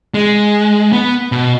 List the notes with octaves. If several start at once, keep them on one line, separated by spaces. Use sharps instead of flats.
G#3
B3
B2